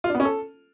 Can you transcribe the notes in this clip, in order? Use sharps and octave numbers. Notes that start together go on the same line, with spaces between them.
F4
D4
B3
C#4
A4